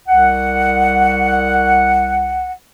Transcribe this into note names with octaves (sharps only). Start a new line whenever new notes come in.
C2 F#5